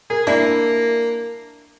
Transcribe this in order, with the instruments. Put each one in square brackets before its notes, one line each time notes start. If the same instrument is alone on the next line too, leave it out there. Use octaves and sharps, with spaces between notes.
[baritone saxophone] G#4 [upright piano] A#4
[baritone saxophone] A#3 [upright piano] D4 [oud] E4